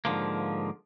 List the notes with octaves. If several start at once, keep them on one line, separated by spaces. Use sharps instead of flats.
G#2 D3 F3 A#3